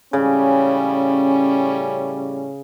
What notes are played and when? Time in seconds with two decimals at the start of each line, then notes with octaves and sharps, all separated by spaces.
0.13 A2 C#3 G3 C#4